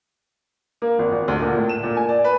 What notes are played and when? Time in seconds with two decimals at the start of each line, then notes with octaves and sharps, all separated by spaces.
0.82 A#3
0.99 G#1
1.12 G#1
1.28 D2
1.41 A#2
1.57 A2
1.69 E7
1.83 A#2
1.97 G#5
2.09 D5
2.24 B4